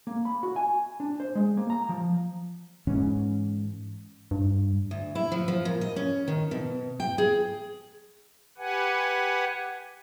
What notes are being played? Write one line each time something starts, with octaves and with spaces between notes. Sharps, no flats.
A#3
B5
F#4
G#5
D4
C5
G#3
A#3
A#5
F3
G#2 E3 C#4
G2
D2
E4
F3
F3
A#2
D#5
C#4
D#3
B2
G5
G#4
G4 B4 F#5 G#5